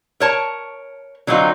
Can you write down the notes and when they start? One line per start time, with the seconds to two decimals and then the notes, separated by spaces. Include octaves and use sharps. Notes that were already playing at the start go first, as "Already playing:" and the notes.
0.20 A#4 C#5 A5
1.27 D3 F#3 C4 D#4 F4